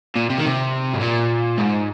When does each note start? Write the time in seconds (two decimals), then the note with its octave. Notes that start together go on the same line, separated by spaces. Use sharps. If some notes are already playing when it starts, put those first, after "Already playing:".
0.16 A#2
0.30 C3
0.38 D#3
0.46 C3
0.94 G#2
1.01 A#2
1.57 G#2